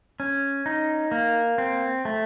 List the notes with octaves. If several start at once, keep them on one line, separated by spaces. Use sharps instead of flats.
C#4
D#4
A#3
C4
A3